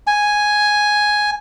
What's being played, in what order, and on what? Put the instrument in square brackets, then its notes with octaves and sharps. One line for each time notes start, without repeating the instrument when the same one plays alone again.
[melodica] G#5